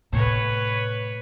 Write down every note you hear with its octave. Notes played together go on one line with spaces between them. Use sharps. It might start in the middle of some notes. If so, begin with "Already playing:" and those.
A2 C3 B4 C#5